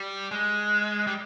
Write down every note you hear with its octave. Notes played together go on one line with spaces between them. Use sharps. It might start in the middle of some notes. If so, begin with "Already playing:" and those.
Already playing: G3
G#3
G3